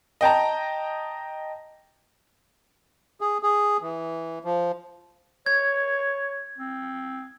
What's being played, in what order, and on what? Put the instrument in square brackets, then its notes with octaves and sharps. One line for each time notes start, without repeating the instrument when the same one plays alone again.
[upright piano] D#5 G5 A5 A#5
[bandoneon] G#4
G#4
E3
F3
[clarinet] C#5 [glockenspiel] G#6
[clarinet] C4